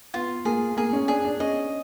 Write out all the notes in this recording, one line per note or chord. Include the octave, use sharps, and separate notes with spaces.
B3 F4
A#3 G#4
A#3 G#4
C#4
D4 G#4
D4
C#4 D#5